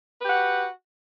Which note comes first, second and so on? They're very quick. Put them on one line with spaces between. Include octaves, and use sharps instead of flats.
B4 G4 F#5 F#4